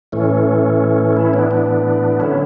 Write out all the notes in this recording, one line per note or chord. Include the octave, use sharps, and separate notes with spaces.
A2 E3 A3 C#4
C#4 E4
B3 D4
B3 D4
D3 F#3 C#4 E4